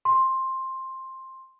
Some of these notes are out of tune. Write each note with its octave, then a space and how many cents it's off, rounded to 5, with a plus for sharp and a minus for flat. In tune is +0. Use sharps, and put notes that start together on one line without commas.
C6 +10